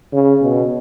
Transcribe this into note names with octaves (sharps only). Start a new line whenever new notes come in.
C#3
B2